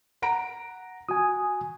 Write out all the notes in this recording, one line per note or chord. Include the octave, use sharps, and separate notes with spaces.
F#5 A#5 D7
F#4 G#5 D#6